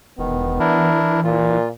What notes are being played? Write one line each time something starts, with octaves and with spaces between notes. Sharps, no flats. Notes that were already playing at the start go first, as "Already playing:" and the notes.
E1 D#3 B3
E3 D4 E4 A#4
A#2 F4